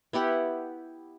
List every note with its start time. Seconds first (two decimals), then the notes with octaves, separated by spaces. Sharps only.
0.13 B3 E4 G4 F#5